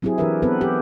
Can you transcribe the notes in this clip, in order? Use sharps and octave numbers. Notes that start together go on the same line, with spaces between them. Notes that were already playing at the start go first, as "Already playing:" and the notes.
F#3 C4 E4 G4 G#4
E3 D4 G4 A#4 B4 E5
B3 C4 A4 B4
G4